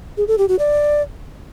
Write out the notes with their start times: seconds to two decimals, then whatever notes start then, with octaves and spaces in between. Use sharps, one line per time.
0.17 G#4
0.28 A4
0.38 G4
0.49 F#4
0.59 D5